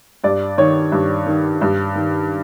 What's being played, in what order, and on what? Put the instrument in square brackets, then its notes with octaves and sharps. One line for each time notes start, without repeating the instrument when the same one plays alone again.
[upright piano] G2 D5
D#3 C#5
G2
D#3
G2
D#3